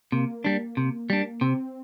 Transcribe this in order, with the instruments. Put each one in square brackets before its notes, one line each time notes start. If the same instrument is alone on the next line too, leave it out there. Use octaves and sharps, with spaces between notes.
[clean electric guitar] C3 [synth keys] A#3
[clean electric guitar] G3 D4
C3
G3 D4
[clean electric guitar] C3 [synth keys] C4